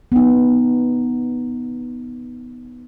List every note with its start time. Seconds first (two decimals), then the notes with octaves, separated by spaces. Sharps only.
0.12 B3 D#4